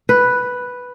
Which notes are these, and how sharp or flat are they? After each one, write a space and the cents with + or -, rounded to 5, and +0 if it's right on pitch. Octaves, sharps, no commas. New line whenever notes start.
B4 +0